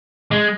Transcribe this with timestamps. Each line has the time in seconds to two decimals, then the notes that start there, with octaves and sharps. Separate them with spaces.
0.31 G#3